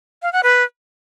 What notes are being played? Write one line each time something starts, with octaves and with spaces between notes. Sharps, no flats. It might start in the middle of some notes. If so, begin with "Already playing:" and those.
F5
F#5
B4